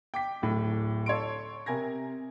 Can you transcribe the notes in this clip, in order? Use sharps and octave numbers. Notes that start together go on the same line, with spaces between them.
G5 D6 B6
D1 A2
A4 C#5 C6 D7
C3 A#4 G#5 G#6 A#6